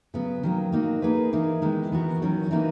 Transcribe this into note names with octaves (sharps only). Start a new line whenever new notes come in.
C#3 F#3 B3
D#3 F#3 A#3
A#3 D#4 F#4
A#3 D#4 G#4 B4
E3 A#3 D#4 A#4
D#3 G#3 B3 E4
E3 B3 F#4 A#4
D#3 F#3 C#4
E3 A#3 D#4 F#4 B4